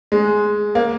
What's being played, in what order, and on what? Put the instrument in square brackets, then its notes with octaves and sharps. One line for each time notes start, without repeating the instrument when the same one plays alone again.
[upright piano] G#3
A#3